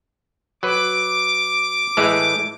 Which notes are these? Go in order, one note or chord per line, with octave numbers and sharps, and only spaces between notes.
F#3 B4 D6
A2 E3 G#3